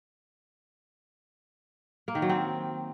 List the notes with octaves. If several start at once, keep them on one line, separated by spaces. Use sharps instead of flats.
A#3
D#3
F#3
C4